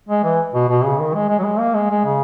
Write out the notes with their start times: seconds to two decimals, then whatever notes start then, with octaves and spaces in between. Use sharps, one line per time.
0.09 G#3
0.24 E3
0.54 B2
0.68 B2
0.84 C#3
0.99 D#3
1.14 G#3
1.29 G#3
1.39 F#3
1.44 G#3
1.59 A#3
1.75 G#3
1.90 G#3
2.05 C#3